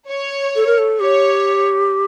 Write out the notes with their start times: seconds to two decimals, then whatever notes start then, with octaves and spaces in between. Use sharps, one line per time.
0.10 C#5
0.56 A4
0.67 A#4
0.78 A4
1.00 G4 C#5